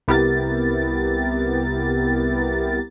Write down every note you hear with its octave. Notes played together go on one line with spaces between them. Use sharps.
C2 B3 E4 G4 A#4 A6